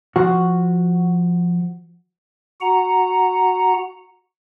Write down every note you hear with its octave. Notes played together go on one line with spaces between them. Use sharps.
F3 F#4
F#4 F#5 A#5